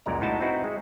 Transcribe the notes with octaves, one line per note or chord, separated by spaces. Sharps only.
C#2 F#2 A#2 G#3 D5 A#5
A2 B3 D#4 E4 F#4 A5
C4 D#4 E4 F#4 B4
G#3